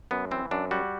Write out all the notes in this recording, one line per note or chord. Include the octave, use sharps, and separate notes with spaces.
F#2 B3
E3 C4
F#2 D4
G3 F#4